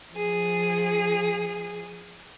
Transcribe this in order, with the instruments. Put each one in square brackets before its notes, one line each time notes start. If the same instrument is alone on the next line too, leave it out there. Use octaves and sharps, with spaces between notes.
[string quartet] F3 G#4